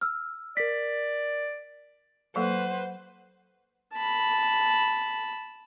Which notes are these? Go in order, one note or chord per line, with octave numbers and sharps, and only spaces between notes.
E6 F6
A#4 D5 B6
F#3 A#3 A4 B4 C5 F#5
A5 B5